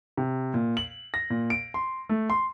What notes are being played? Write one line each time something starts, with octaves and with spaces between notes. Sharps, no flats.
C3
A#2
F#7
A#6
A#2
D7
C6
A3
C6